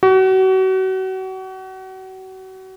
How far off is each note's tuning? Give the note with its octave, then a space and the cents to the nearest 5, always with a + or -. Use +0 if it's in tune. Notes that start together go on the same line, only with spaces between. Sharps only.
F#4 +35